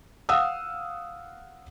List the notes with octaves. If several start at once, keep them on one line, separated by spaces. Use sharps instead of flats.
F5 F#5 D#6 E6